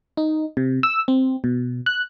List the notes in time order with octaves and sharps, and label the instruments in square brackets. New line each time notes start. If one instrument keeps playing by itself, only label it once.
[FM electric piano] D#4
C3
E6
C4
B2
F#6